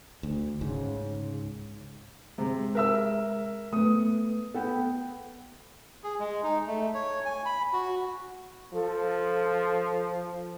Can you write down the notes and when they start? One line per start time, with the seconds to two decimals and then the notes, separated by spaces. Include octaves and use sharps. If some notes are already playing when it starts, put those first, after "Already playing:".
0.23 D2
0.61 C#2 G#2 C#3
2.38 C3 G#3
2.75 A#4 E5 E6
3.73 A3 B3 D#6
4.54 B3 A4 F#5 G5
6.04 G#4
6.20 G#3
6.43 D#4
6.67 A3
6.94 C#5
7.25 G#5
7.46 B5
7.73 F#4
8.73 F3 A4